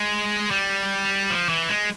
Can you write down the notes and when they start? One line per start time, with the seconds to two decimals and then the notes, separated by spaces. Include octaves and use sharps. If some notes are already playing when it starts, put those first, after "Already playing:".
Already playing: G#3
0.51 G3
1.30 F3
1.49 E3
1.69 G#3